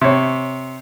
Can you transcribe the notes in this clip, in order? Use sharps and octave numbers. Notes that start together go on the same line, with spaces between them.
C3 C#5